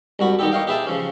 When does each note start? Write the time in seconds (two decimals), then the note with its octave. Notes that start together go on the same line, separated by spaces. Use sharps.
0.19 C2 G2 F#4 B5
0.39 D#3 B3 D#4 G4 A4
0.51 C#5 D#5 F5 G5
0.67 G4 G#4 B4 E5 G5 A5
0.87 C#3 F3 C#4